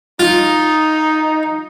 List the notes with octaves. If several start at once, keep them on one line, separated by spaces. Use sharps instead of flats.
D#4 F4